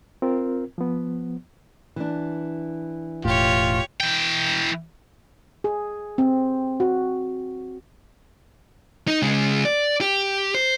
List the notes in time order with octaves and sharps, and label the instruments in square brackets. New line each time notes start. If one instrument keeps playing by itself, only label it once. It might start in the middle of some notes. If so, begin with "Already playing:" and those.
[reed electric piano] C4 F4 A#4
F3 B3
[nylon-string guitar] E3 D4
[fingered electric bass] E1 A2 [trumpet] F4 [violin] G4 C#5
[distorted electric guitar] E3 G5
[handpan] G#4
C4
F#4
[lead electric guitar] D#4
C#3 G#3
D5
G4
C5